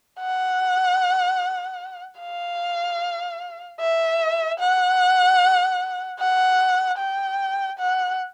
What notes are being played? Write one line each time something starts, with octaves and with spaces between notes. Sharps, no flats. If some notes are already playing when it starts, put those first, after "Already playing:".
F#5
F5
E5
F#5
F#5
G5
F#5